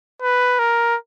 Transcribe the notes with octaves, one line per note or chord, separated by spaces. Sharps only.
B4
A#4